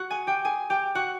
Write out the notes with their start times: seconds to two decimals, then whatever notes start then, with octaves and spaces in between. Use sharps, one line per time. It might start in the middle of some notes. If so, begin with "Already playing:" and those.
Already playing: F#4 F#5
0.10 G#4 G#5
0.27 G4 G5
0.45 G#4 G#5
0.70 G4 G5
0.95 F#4 F#5